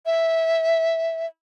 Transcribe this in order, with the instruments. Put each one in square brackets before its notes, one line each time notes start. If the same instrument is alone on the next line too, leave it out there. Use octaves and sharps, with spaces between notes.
[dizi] E5